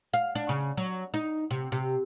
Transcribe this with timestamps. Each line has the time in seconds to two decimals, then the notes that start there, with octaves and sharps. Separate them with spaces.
0.13 F5
0.35 D4
0.49 C#3
0.77 F#3
1.14 D#4
1.51 C3
1.72 C3